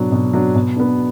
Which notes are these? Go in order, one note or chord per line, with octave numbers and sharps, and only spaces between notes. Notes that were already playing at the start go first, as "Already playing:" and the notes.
Already playing: B2 F#3 D4
B2
F#3 D4
B2
B3 D4